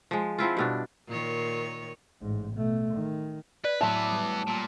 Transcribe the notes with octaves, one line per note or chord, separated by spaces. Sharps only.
F3 G#3
F3 C4 E4 F4
G2 B2 D4
A#2 D#3 C#5
A1 G#2
B2 A3
D#3
B4 D5
A2 E3 F#3 B3 E5 A5 C6
D6 D#6
G3
A#2 A5 E6